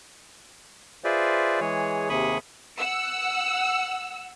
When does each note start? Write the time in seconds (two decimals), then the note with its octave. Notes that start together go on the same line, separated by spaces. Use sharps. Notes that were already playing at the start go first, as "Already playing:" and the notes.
1.04 F4 G#4 B4 C5 D5 E5
1.60 E3 G#3 G#4 C#5
2.09 D#2 C3 G#4 B5 C#6 D#6
2.79 F#5 E6